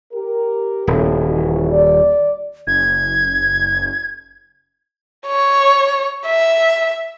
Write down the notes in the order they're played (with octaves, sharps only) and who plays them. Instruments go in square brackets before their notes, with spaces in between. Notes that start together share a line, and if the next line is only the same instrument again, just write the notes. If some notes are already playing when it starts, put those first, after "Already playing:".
[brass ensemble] G4 A#4
[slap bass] D#1 [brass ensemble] A2 C#3
[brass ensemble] E3 F#4
D5
[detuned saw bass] F#1 [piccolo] G#6
[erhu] C#5
E5